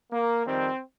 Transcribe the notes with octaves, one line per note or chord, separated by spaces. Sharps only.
A#3
F2 D#3 G3 C4